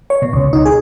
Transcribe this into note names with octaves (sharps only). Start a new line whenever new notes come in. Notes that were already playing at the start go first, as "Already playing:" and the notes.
C#5
B2
C#2
D#4
G#4